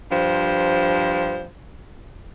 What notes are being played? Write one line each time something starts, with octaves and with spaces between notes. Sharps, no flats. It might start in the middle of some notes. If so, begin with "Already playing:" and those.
G2 F3 C5